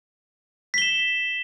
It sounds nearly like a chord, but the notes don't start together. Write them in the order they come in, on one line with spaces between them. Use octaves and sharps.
B6 G7 E7